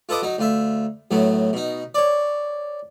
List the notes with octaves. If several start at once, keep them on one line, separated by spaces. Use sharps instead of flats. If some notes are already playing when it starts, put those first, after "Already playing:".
F4 A4 B4 D#5 D6
F#3 D#4
D2 F4 E5
F#2 A2 F#3 B3
B2 D#4
C#5 D5